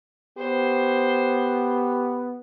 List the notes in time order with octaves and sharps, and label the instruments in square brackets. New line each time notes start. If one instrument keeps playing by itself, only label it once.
[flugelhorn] B3 [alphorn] G4 [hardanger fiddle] C5